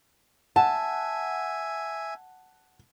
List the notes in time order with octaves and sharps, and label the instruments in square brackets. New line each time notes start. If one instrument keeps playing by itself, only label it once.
[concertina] E5 G#5 [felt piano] F#5 [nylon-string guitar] A5